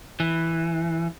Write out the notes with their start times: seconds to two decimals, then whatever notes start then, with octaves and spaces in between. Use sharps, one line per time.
0.20 E3